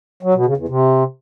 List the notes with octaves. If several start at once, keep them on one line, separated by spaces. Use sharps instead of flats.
F#3
B2
C#3
E2
C3